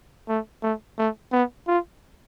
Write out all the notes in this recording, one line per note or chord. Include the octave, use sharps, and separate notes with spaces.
A3
A3
A3
B3
F4